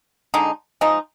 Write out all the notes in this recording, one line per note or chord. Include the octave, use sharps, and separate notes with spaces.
D3 G#3 D#4
F3 G#3 D#4